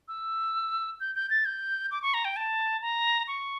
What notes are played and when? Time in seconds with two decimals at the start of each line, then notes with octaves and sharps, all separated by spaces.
0.08 E6
1.00 G6
1.15 G6
1.30 A6
1.45 G6
1.91 D6
2.02 C#6
2.14 A#5
2.25 G5
2.36 A5
2.82 A#5
3.28 C#6